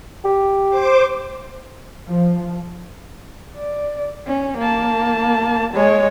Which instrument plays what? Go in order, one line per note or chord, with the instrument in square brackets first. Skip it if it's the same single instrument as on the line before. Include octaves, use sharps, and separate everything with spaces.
[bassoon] G4
[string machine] C5 D6
[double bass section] F3
[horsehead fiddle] D5
C#4
A#3 A5
G#3 C#5